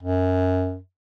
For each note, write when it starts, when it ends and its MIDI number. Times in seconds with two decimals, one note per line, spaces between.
0.03 0.78 42